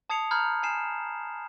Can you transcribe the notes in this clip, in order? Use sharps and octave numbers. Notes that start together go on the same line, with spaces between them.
A5 D#6 G#6 C7 C#7 F7
A#5 B5 F6 G6 G#6
G#5 F6 C7 E7